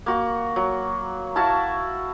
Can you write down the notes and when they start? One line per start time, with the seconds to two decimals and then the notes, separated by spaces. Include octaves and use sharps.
0.06 A#3 F#4
0.56 F#3
1.36 E4 F#4 F5 A5